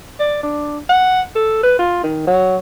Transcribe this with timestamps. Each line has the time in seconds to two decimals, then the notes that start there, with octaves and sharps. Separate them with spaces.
0.20 D5
0.43 D4
0.89 F#5
1.35 A4
1.63 B4
1.79 F4
2.03 D#3
2.27 F#3